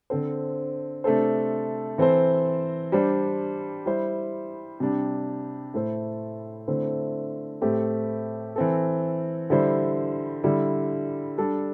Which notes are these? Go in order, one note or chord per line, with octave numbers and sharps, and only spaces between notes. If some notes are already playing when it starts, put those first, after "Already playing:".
D3 C4 A4 C5
C3 A3 D4 A4 C5
E3 C4 A4 C5
G3 D4 C5
G3 E4 C5
C3 G3 D4 G4
A2 A3 E4 A4 C5
D3 A3 C4 E4 C5
A2 A3 C4 G4
E3 C4 A4
D3 G3 E4 C5
D3 G3 E4
G3 D4 A4